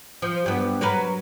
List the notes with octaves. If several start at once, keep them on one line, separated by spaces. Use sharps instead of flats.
F3
G2 B3
F#3 A#4 B4